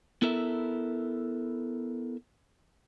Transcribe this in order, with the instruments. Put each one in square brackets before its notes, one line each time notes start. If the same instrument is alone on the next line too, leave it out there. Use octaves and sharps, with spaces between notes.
[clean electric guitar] B3 E4 A4 A#4 E5